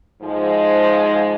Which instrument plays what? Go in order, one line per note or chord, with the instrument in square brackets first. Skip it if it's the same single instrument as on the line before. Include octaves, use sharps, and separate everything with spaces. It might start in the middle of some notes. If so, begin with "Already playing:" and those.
[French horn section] G#2 F3 G#3